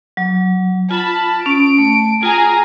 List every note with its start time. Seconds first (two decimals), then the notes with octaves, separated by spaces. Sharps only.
0.17 F#3
0.91 F4 A5 B5
1.46 C#4 D7
1.78 A3
2.23 F4 G#4 G5 G#5 A#5